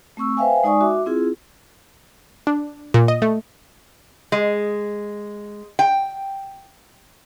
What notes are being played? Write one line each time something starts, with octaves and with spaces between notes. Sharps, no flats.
A3 C4 C#6 E6
B4 C5 E5 F5 G5 G#5
G#3 D#4 D5 G#5 C#6 D#6
F#4 E5 D6
C4 E4 F4 G#4
D4
A#2
D#5
A3
G#3
G5